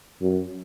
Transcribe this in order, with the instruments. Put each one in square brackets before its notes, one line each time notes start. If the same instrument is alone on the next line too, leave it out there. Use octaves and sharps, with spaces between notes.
[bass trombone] F#2